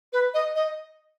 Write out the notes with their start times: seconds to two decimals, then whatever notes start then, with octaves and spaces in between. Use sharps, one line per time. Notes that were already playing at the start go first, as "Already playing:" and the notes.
0.13 B4
0.34 D#5
0.55 D#5